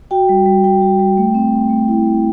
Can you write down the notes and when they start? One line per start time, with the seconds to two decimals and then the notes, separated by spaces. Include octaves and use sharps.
0.11 F#4 G5
0.29 G3
0.46 G3
0.64 G3 G5
0.82 G3
0.99 G3
1.18 A3
1.34 C4
1.53 C4
1.70 A3
1.88 E4
2.05 A3